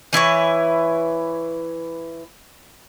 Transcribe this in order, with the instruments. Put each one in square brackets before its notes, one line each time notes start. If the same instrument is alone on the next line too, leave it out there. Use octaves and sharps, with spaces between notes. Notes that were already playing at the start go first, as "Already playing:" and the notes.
[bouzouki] E3 E4 B4 C#5